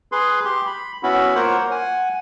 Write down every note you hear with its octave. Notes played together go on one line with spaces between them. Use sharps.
G#4 B4 C6
G4 C6
B5
B3 C#4 E4 F#4 B5
A#3 F4 A#4 C5 C#5 F#5
F#5 G#5